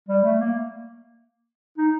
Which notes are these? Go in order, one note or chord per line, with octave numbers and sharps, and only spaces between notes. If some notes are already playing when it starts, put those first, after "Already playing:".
G3
A3
A#3
D#4